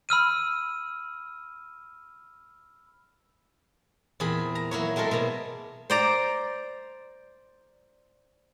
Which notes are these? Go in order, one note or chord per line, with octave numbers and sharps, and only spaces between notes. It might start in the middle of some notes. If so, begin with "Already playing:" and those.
B5 E6 F6 D#7
E2 A#2 C4 G#4 B5
A#5
F#3 A#3 E4 C#5
F#3 G#3 C4 A4 A#4
B2 A#3
C5 D5 A#5